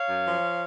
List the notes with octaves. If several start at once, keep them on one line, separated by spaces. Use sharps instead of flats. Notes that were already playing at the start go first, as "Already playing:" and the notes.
Already playing: C#5 F5
F#2
F3